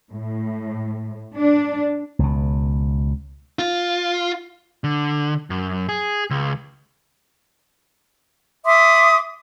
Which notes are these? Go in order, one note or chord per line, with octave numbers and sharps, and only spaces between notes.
A2
D4
C#2 B2
F4
D3
F#2
G#4
C#2
E5 C6 D6 D#6